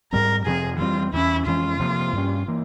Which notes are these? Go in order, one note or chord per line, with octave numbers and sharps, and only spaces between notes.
G#2 G3 C4 A#4
F2 C3 F3 C4 G#4
F2 E3 G3 C4 F4
E2 E3 A#3 C#4 E4
F2 E3 G#3 C#4 F4
C3 F3 A#3
G2 G3 C#4
E3 A#3